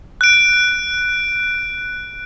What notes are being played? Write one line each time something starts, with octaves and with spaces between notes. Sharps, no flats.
F#6 D7